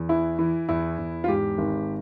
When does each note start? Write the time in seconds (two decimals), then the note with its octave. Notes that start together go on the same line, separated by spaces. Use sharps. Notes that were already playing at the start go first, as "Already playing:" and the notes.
Already playing: E2
0.09 E3 E4
0.39 E3
0.69 E2 E4
0.98 E2
1.24 F4
1.28 G#2 G4
1.58 G#1